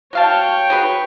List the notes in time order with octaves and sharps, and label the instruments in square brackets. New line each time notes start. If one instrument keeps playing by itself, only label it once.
[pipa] F#3 F5 A5 [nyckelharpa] C#5 G5
[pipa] F#3 G#4 B4